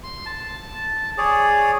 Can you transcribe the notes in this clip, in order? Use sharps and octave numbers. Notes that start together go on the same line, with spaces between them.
C6
A5
G#4 C#5 D5